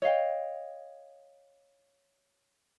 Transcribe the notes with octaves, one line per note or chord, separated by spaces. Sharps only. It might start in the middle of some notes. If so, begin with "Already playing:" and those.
C#5 D#5 F5 G5